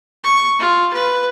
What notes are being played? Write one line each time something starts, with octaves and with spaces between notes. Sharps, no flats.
C#6
F4
B4